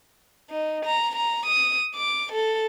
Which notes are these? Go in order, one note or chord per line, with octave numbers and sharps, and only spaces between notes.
D#4
A#5
A#5
D#6
D6
A4